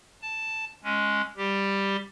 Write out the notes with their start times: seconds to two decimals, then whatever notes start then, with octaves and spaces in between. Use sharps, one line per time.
0.22 A5
0.84 G#3 C#4
1.37 G3 G4